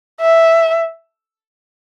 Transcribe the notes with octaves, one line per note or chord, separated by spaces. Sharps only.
E5